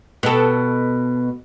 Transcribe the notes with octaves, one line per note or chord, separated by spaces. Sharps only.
B2 A4